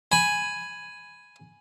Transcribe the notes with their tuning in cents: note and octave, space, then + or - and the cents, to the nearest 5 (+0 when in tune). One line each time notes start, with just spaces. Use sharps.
G#5 +0 B5 +0